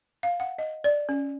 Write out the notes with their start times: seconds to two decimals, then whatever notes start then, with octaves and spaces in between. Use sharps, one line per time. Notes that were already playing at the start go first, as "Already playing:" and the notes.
0.23 F5
0.40 F#5
0.59 D#5
0.84 D5
1.09 C#4